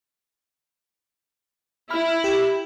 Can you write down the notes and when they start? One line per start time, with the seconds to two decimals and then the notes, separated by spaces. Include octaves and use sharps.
1.90 E4 B5 F6
2.24 G4